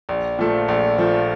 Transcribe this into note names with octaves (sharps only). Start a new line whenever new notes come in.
A#1
A#2 F3 A3
A#1
A#2 F3 A3